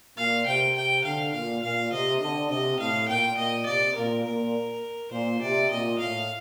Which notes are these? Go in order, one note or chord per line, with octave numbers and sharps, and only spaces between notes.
A#2 F5
C3 G5
G5
D3 F5
A#2 F5
A#2 F5
C3 D#5
D3 D#5
C3 D#5
A2 F5
A#2 G5
A#2 D#5
C3 D5
A#2 A#4
A#2 A#4
A#2 C5
C3 D5
A#2 D#5
A2 F5